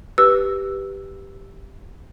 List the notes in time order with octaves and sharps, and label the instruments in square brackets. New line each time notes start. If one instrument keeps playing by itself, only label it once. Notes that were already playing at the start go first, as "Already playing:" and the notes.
[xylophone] G4 B4 E6